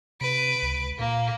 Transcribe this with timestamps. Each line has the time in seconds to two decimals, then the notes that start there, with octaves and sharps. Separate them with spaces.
0.21 C3 B4 D7
0.63 C#2
0.99 A#2 A#3